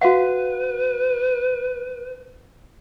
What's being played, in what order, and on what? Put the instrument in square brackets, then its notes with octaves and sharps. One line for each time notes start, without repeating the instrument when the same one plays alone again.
[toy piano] F#4 F5 F#5 [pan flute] B4